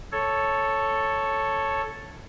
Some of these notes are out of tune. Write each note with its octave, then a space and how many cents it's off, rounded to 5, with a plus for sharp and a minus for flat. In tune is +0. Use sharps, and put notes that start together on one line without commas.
A4 +0 C#5 +0